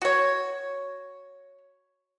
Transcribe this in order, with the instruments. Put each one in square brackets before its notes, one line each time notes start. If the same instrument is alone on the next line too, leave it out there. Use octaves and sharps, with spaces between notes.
[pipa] F#4 C#5